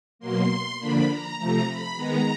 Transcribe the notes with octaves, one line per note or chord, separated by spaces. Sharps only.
B2 F#3 A#3 C6
D3 F3 A#3 D4 B5
A#5
C3 F3 A3 A#5
B5
D#3 G#3 B3 A#5